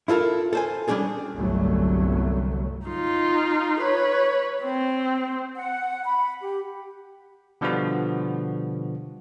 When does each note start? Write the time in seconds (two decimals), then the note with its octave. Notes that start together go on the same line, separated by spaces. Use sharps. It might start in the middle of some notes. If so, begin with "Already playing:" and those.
0.08 E4 F4 A4 A#4
0.53 A4 C5 G#5
0.88 G3 C#4 D4 G#4 A4
1.34 G1 C2 F#3 A3
2.87 D#4 F4
3.81 B4 C#5
4.64 C4
5.55 F#5
6.05 B5
6.41 G4
7.61 B2 D3 F3 G3 B3 F#4